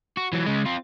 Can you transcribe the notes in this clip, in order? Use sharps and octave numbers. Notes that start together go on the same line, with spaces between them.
F#4
E3 F#3
C#3 G#3
C4 F4